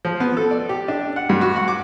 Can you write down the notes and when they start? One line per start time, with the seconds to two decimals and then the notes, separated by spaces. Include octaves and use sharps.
0.05 F3
0.20 B3
0.37 A4
0.51 D5
0.69 G4
0.88 D4
1.16 F#5
1.29 G2
1.41 F#4
1.56 F#5
1.68 D6